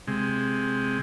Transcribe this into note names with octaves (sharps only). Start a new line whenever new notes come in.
C3 G#3